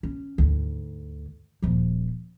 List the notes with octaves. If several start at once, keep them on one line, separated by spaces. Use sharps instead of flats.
C#4
D2 G#2
D#1 F3